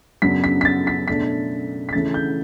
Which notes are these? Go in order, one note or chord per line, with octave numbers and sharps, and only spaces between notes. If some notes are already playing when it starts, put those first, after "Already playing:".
F#2 C#3 F#3 B3 D4 B6
B6
B6
A6
B6
B2 A3 D4 B6
B6
C#3 E3 A3 C#4 A6
G6